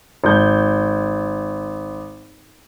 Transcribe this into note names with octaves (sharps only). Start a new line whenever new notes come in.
G#1 G6